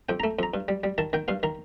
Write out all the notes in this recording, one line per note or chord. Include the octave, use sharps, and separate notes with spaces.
F2 G5
A3 A#5
F2 A#5
G2
G3
G3
D#3 A5
D#3 G5
G2 F5
D#3 A#5